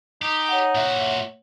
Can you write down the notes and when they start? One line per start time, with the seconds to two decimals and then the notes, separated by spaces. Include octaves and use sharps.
0.22 D#4 G4
0.48 C#5 F#5
0.75 A#2 F#4 E5